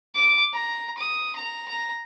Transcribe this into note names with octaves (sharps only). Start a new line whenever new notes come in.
D6
A#5
D#6
A#5
A#5